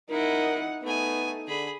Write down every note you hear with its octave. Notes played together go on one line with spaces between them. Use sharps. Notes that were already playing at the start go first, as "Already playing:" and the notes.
D#4 E4 A#4 D#5 F#5
A3 B3 D#4 G#5
D3 G#4 B5